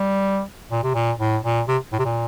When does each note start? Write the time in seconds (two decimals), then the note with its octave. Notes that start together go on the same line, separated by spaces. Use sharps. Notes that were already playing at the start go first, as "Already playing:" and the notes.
Already playing: G3
0.71 A#2
0.83 C3
0.94 A#2
1.20 A2
1.44 A#2
1.68 C3
1.93 A2
1.99 C3
2.05 A#2